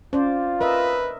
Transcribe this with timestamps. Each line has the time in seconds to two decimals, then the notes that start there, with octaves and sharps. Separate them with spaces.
0.13 C#4 F4 C5 D5
0.61 A#4 B4 D#5 E5